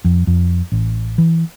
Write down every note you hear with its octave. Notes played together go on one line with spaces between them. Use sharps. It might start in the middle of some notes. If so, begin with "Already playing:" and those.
F2
F2
A1
E3